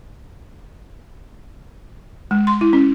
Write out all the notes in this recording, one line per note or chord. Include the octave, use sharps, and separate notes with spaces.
G#3
C6
E4
C#4